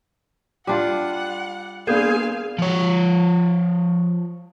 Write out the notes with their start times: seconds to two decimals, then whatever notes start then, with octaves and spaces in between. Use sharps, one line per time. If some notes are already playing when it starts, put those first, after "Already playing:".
0.67 G3 D4 F4 F#5 C6 D6
1.87 A#3 B3 D4 G#4 C5 F5
2.59 F3 C#5